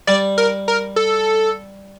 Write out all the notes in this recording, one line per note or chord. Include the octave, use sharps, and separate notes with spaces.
G3 D5
A#4
A#4
A4